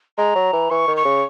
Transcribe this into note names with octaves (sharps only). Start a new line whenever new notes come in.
G#3 A#5
F#3
E3
E3 C#6
D#3
C#6
C#3